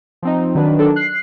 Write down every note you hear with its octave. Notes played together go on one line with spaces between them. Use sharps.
F3 C4 D#4
D#3 F#3 D4 B4
D#3 F#3 D4 A4
F#6 C7